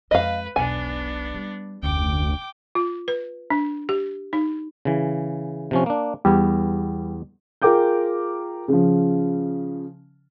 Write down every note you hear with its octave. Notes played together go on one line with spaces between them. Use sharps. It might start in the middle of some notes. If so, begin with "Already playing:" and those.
F2 G#3 B4 D#5 F5
E1 B1 B3 D4 G#5
G3
F1 D2 C#4 G5 D6
F4
B4
D4
G4
D#4
C#3 E3
C3 F3 C#4
A#3 D4
E2 G3 B3
F4 G#4 A#4 G5 D6 G6
C#3 F3